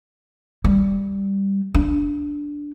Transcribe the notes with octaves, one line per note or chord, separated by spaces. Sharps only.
G3
D4